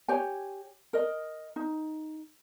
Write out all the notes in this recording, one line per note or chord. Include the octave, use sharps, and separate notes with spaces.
G4 C#5 G#5
A#4 D#5
D#4